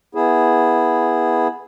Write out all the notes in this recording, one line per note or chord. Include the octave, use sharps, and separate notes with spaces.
B3 E4 G#4